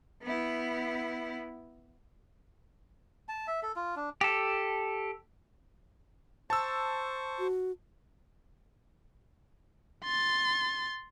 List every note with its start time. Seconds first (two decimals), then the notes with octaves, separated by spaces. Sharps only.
0.23 B3 E4
3.29 A5
3.47 E5
3.63 A4
3.76 F4
3.96 D4
4.21 G4 A4
6.50 C5 A5 C#6 E6
7.39 F#4
10.05 C6 A6